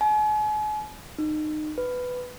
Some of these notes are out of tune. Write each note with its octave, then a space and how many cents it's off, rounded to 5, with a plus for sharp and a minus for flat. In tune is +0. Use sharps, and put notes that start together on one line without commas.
G#5 +40
D#4 -25
B4 +10